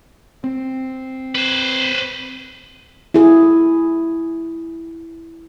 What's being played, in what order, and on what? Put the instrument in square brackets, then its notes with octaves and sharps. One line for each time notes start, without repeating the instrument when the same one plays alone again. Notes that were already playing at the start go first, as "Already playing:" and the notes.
[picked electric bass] C4
[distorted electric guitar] B4 C5
[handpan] E4 G#4